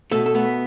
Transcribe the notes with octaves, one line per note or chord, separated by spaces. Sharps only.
B2 A3 A4
A4
A3 B3 B4